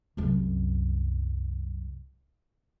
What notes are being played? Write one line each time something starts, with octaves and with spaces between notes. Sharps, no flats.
C2 F#2